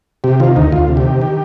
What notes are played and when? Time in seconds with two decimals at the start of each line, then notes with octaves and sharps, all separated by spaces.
0.24 C3 G4
0.40 D#3 F4
0.56 D2 D#4
0.72 D2 F4
0.88 C3
0.97 G4
1.04 D#3
1.21 D#3